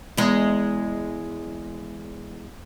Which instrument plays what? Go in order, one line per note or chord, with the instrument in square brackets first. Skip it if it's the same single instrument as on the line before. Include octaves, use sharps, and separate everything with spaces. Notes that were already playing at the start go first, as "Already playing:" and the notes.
[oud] E2 G#3